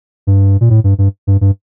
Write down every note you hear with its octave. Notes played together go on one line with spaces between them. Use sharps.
G2
A#2
A2
G2
G2
G2
G2